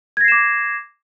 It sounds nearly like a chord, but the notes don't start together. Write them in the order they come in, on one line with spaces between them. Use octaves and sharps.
G#6 A#6 C7 E7 D6